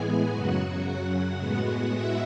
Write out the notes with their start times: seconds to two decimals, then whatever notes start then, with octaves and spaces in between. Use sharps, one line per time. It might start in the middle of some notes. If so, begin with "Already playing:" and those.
Already playing: A2 E3 G#3 B3 G#4 G#5
0.31 F#2 C#3 F#3 F#4 F#5
1.40 A2 G#3 B3 F#4 F#5
1.94 E4 E5